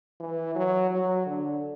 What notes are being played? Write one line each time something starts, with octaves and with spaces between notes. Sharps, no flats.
E3
F#3
F#3
D3